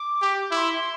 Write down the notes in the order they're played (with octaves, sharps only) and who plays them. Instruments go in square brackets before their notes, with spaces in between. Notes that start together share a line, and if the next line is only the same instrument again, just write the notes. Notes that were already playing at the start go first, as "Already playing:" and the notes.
Already playing: [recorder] D6
[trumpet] G4
[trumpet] E4 [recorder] D6
[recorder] C6